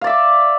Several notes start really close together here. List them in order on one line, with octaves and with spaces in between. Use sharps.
F5 D5 E5 D6